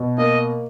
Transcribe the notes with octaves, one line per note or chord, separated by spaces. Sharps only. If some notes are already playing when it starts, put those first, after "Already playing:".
Already playing: B2
A#3 D#5